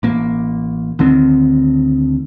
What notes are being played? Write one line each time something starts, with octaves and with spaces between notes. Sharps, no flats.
A1 A#3
D2 D3 D#3 C4